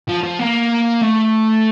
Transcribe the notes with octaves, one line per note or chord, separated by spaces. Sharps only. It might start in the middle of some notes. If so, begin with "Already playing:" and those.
F3
F3
A#3
A3